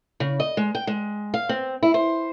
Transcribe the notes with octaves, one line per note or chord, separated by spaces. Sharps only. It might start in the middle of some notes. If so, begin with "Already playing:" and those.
C#3
D#5
G#3
G5
G#3
F5
C4
E4
C5